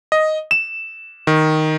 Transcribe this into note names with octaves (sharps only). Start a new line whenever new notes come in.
D#5
E7
D#3